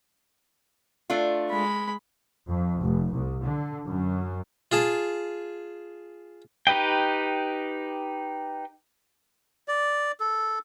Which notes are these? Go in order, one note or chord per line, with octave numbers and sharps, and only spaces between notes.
A3 D4 F4
G#3 B5
F2
F1
C2
D3
F#2
F4 G#4 A5
D#4 G4 B4 D#5 G5
D5
A4